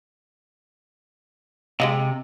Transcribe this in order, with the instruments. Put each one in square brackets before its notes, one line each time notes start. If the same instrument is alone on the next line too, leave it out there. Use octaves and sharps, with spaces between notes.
[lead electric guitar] C3 [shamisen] G#3 D#5 F5